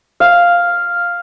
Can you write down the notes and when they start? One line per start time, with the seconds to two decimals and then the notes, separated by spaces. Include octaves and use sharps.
0.20 F5